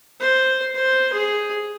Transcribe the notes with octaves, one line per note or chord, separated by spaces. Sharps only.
C5
C5
G#4